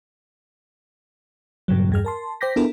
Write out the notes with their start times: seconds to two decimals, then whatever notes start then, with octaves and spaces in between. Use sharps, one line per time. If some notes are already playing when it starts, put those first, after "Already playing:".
1.68 G2 A#2 C#3 F#3
1.90 E2 G2 G#4 F6
2.05 A#4 A5 C6
2.41 C5 G5 D6 G6 A#6 B6
2.56 B3 D4 E4 F4 A4 A#4